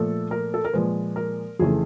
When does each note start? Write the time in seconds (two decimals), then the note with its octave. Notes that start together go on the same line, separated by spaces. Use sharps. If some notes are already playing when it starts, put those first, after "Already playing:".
Already playing: A#2 F3 A3 A4
0.31 A#4
0.54 A4
0.65 A#4
0.73 A#2 F3 G#3 B4
1.16 A#4
1.59 F2 C#3 E3 A3 G#4